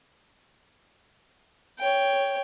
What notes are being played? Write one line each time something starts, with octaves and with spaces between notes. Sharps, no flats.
C#5 G5